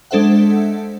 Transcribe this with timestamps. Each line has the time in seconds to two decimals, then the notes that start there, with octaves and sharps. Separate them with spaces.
0.11 G#3 D4 A4 C5 E5 F#5